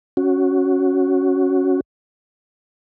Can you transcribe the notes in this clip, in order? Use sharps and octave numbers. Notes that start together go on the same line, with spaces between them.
C#4 F#4